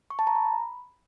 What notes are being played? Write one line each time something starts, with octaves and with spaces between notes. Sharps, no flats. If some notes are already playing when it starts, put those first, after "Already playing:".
C#6
A5
A#5
B5